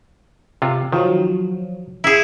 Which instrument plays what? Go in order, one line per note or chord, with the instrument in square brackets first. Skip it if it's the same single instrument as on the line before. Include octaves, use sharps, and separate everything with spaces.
[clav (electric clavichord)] C3 F4
[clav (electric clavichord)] D#3 [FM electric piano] F3 F#3
[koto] E4 G#4